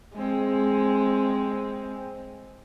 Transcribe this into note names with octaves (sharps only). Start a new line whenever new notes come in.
G#3 C4